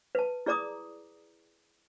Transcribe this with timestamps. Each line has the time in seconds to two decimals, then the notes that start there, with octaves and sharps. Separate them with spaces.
0.15 B4 A5
0.46 E4 G#4 D5 A#5 D6 D#6